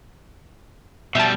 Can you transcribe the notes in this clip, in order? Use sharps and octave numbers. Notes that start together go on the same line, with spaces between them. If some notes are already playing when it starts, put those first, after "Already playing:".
B2 G3 E5 A5